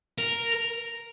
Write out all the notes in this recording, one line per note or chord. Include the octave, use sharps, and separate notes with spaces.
A#4